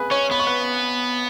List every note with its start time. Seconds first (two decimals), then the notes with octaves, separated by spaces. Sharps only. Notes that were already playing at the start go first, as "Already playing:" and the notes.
Already playing: G#4 B4 G#5 B5
0.11 C#4 C#5 C#6
0.31 B3 B5
0.39 C#6
0.47 B4 B5